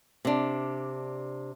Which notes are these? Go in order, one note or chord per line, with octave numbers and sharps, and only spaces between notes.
C3 D4